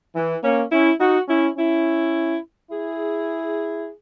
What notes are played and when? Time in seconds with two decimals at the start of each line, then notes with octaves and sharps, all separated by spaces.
0.15 E3
0.43 A#3 C#4
0.72 C#4 E4
0.99 D#4 F#4
1.28 C#4 E4
1.57 C#4 E4
2.71 E4 G#4